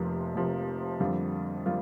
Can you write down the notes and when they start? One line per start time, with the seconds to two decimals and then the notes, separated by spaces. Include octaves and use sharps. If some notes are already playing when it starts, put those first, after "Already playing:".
Already playing: F1 F2 C3 F3 A#3
0.34 F1 F2 C3 F3 A#3
1.00 F2 D3 G3 A#3 F4
1.66 G3 A#3 F4